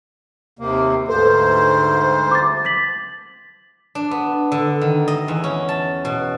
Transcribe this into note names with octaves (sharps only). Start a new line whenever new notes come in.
D#2 C3 A#3
D2 G#2 A4 B4 C5
D6 A6
A6 B6 F#7
D4
B3
D3
D#3
D#5
E2
C#4
A5
B2